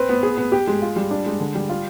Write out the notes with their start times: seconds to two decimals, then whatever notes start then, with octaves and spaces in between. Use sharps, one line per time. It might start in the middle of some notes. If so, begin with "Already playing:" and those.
Already playing: C4 B4
0.09 B3
0.23 G#4
0.37 B3
0.52 G4
0.67 G#3
0.82 F4
0.96 G3
1.11 D4
1.26 G#3
1.40 D3
1.55 G3
1.69 F4